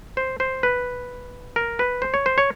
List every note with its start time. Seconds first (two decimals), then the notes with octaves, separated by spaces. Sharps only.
0.17 C5
0.40 C5
0.63 B4
1.56 A#4
1.79 B4
2.02 C5
2.14 C#5
2.26 C5
2.38 C#5